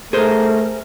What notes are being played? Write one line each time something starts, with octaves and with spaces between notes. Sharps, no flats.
A3 G#4 A#4 C5